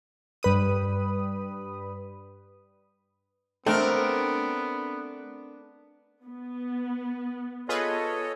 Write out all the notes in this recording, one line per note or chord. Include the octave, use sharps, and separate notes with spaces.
G2 B4 D#6
A3 B3 C4 D4 A#4
B3
F4 G#4 A4 B4 C#5 D#5